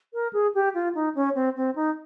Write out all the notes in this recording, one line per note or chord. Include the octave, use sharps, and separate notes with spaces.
A#4
G#4
G4
F4
D#4
C#4
C4
C4
D#4